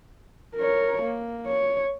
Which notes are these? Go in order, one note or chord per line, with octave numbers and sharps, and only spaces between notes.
A#4 C#5
A#3
C#5